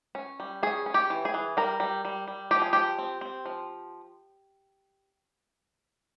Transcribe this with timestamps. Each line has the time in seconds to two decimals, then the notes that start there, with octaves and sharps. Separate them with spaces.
0.15 C#4
0.40 G3
0.63 C#4 G#4
0.86 C#4
0.94 G4
1.10 E3
1.25 G#4
1.34 E3
1.57 G3 A#4
1.80 G3
2.05 G3
2.28 G3
2.51 F3 G4
2.62 G#4
2.73 F3 G4
2.98 C4
3.21 C4
3.45 F3